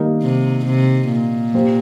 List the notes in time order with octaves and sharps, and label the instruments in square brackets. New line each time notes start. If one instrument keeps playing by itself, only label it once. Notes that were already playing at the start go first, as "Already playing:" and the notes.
Already playing: [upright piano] D#3 G3 A#3 D#4 A#4
[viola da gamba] C3
C3
A#2
[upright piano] A#3 G4 C5